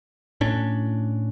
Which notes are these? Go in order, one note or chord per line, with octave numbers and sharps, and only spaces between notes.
A2 C#4 D4